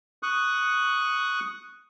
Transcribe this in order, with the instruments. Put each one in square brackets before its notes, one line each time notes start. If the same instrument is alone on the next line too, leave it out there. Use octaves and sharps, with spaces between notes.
[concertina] C#6 D#6 F#6